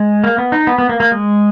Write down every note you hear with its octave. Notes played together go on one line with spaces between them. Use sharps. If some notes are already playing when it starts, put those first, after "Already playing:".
Already playing: G#3
A#3
B3
D#4
B3
B3
A#3
A#3
G#3